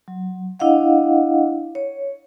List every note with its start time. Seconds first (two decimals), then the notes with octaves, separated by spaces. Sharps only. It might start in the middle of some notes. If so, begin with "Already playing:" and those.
0.08 F#3
0.59 D4 E4 D#5 F5 F#5
1.75 C#5